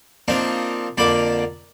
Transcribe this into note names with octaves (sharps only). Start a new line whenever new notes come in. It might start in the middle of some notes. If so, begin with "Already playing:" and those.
F3 A#3 C4 D4 D#4
F2 D3 A#3 D5 B5 D6